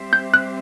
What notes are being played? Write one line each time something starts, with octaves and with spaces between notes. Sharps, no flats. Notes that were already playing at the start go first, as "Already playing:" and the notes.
Already playing: G3 C4 G4 C5 E5
G6
F#6